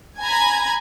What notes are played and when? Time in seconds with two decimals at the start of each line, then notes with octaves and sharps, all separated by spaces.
0.20 G#5 A#5 B5 G#6